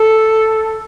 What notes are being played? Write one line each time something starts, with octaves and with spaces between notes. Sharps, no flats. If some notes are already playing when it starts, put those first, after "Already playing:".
Already playing: A4